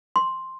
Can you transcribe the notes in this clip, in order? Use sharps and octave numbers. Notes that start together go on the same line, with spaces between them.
C6